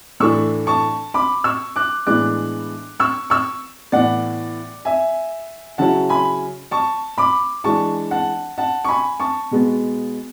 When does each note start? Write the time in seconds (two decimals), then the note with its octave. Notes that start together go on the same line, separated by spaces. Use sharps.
0.20 A2 E3 A3 D4 C#6 E6
0.67 A5 C#6
1.14 B5 D6
1.44 C#6 E6
1.76 D6 F#6
2.06 A2 E3 G#3 B3 D4 D6 F#6
3.00 C#6 E6
3.30 C#6 E6
3.92 A2 E3 B3 D5 F#5
4.85 E5 G#5
5.78 C#3 F#3 C#4 E4 F#5 A5
6.09 G#5 B5
6.71 A5 C#6
7.18 B5 D6
7.64 E3 G#3 D4 A5 C#6
8.11 F#5 A5
8.58 F#5 A5
8.85 C#6
8.88 G#5 B5
9.20 A5 C#6
9.51 B2 G#3 B3